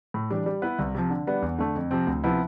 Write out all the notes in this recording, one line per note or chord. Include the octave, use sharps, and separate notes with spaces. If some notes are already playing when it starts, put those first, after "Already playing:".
A2
E3 G3 D4
G3
B3 E4 B4
C2
C3 F3
D3
G3 B3 D4
E2
D3 A3
F2
C3 F3 C4
D2
C3 F3 B3 E4